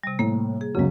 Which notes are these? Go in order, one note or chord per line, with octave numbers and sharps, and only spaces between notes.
C3 G3
A2 A#3
G#4
C#2 F#2 C#3 F#3 G#3